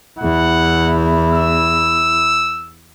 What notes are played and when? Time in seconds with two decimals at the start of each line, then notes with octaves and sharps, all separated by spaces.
0.20 E2 E4 F#5
1.33 E6